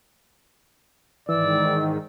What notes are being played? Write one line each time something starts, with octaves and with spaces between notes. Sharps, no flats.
G#2 D#3 E3 D5 E6